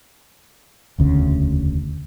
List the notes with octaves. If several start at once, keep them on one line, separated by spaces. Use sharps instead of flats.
E1 D2 C#3